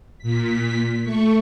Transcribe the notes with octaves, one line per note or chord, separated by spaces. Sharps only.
A#2 B6
A3 C#6